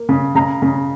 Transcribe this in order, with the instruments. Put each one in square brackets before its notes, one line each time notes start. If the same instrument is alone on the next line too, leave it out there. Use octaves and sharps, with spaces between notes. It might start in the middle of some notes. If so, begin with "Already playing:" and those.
Already playing: [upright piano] A#3
C#3
C#3 A#5
C#3